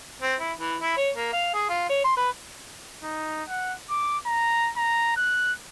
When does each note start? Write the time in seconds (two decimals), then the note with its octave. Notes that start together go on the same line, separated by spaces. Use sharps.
0.22 C4
0.40 E4
0.58 E3
0.81 E4
0.97 C#5
1.15 A#3
1.32 F5
1.54 G#4
1.69 F4
1.89 C#5
2.04 C6
2.17 B4
3.04 D#4
3.49 F#5
3.90 D6
4.26 A#5
4.77 A#5
5.17 F#6